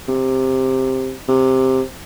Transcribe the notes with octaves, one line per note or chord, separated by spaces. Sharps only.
C3
C3